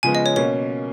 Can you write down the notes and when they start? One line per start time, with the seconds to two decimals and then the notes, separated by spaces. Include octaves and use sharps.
0.03 C#3 F3 G#3 B3 G#5
0.15 D#5
0.26 C#5
0.36 B2 A#3 C#4 C#5